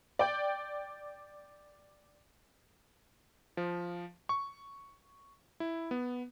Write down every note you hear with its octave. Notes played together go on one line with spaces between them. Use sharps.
D5 G5
F3
C#6
E4
B3